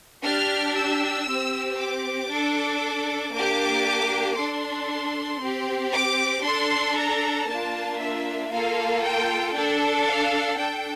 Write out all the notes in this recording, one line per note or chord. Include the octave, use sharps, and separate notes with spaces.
D4 G4 F6
E6
C4 G4
D6
D4 A4
A#3 D4 G4 D6
D4 A4 C6
C4 G4
D6
D4 A4 C6
A#5
A#3 D4 F4 A5
E5
A#3 F4 A4 F5
G5
D4 A4
F5
D4 A4 G5